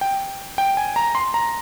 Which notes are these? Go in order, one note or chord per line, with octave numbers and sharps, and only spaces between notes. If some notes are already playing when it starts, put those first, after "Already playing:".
G5
G5
G#5
A#5
C6
A#5